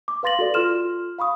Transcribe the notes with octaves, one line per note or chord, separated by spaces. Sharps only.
D6
B4 F5 C6 A6 A#6 F#7
F#4 A4 D5
F4 A4 C6 F6 E7
F5 B5 C#6 D#6